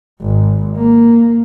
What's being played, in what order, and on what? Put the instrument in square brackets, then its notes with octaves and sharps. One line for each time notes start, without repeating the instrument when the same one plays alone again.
[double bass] G#1
A#3